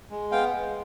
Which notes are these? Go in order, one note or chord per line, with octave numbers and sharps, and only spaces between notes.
G#3
B3 F5 G5
G#3